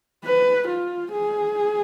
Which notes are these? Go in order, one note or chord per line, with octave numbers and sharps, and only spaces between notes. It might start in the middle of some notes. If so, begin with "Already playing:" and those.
B4
F4
G#4